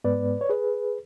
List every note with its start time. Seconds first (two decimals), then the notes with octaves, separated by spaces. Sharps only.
0.04 G#2 G#3 B3 B4 D5
0.41 C#5
0.50 G#4 B4